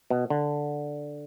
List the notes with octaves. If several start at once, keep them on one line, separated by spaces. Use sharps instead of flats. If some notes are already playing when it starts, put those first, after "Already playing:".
B2
D3